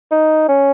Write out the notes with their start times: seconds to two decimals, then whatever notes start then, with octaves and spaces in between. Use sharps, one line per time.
0.11 D#4
0.48 C#4